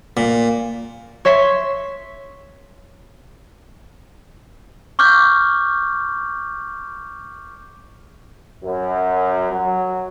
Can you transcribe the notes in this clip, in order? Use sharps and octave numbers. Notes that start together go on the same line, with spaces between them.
A#2
C#5 E5 C6 B6 C7
C#6 D6 F6 G6
F#2
F#3